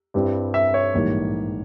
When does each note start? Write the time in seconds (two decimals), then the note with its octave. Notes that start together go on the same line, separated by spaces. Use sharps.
0.14 G2 G3 C4 E4
0.54 E5
0.74 C#5
0.94 A#1 G#2 E3 G3 A#3